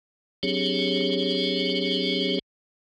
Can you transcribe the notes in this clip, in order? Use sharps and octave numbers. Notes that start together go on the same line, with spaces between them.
F#3 C4 D4 G4 G#4 C#5